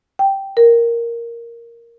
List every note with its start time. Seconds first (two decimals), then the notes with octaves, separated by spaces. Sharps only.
0.19 G5
0.57 A#4